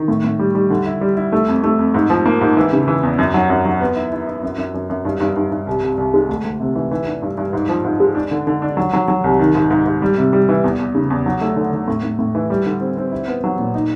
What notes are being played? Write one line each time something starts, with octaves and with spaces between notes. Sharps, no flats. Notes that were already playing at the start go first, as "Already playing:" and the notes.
Already playing: D#3
A2
A2
G3
G3
D3
E4
G3
E4
A3
F2
A3
F2
G#2
F3
A#3
G#2
E3
C#3
E3
E2
F#2
F#3
F#2
F#3
B3
E4
E4
E4
F#2
F#2
F#2
F#2
G2
G2
G2
G2
C2
C2
C2
G#3
D2
D2
C3
E3
E3
D4
G2
G2
G#2
F3
G#2
G#3
D4
D3
D3
D4
F#3
F#3
F#3
C2
D#3
G#2
G#2
G#2
G3
C3
G3
E3
E2
E2
C#3
E2
F#3
A3
D3
D3
A2
A2
A2
E3
G3
D3
C4
C4
E4
B3
F#3
A#2
D#4